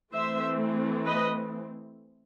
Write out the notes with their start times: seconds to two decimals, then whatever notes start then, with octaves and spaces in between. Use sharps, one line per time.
0.14 E3 A3 C4 C5 E5
1.06 B4 D#5